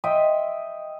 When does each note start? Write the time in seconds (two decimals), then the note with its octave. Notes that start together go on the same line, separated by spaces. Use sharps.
0.04 D#5 E5 G5 C6